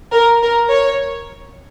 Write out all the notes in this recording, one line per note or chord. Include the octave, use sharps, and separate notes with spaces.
A#4
A#4
C#5